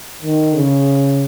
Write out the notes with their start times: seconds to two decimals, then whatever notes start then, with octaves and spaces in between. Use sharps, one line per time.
0.22 D#3
0.55 C#3